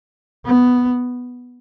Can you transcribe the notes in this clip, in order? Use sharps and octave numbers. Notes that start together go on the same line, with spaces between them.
B3